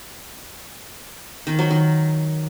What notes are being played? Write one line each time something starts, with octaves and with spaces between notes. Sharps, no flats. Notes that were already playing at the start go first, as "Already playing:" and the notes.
D#3
F#3
D#3